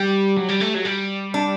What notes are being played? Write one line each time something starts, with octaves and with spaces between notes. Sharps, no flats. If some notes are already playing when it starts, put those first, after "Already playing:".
Already playing: G3 G4
F#3
G3
A3
F#3
G3
D4